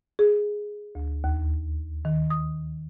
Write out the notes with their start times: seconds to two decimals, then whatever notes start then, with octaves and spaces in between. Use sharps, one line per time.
0.19 G#4
0.95 D2
1.24 D#2
2.05 D#3
2.30 D#6